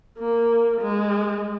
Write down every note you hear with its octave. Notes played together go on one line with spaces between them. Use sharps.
A#3
G#3